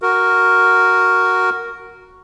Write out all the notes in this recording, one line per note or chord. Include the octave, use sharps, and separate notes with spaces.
F#4 A#4